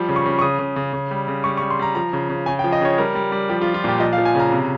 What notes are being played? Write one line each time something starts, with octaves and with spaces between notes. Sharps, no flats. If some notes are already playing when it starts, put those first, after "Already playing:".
Already playing: F3 G3
C#3
C#6
C#3
C#6
C#3 D#6
C#3
C#3
C#3
G3
C#3
G3 C#6
C#6
G3
C6
G3 A#5
F3 A#5
C#3
C#3
C#3 G#5
G5
F3
D#5
C#3 C#5
G3 A#4
G3
G3
F3 G4
F4
F3
F4
A#2 G4
F3 D#5
F5
F3
G#5
C#3 A#5
C3